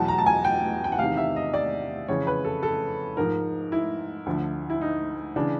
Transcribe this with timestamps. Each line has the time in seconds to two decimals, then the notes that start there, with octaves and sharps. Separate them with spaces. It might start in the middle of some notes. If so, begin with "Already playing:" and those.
Already playing: E2 B2 F#3 A5
0.08 A#5
0.18 A5
0.26 G#5
0.44 G5
0.84 G5
0.92 F#5
0.99 E2 C3 D#3 F5
1.17 E5
1.36 D#5
1.53 D5
2.08 F2 C#3 E3 C#5
2.27 B4
2.44 A4
2.63 A4
3.17 G#2 F3 A#4
3.72 E4
4.26 D2 D3 F3
4.70 E4
4.81 D#4
5.36 C#3 E3 D4